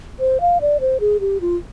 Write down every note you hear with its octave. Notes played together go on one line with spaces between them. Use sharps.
C5
F5
D5
C5
G#4
G4
F4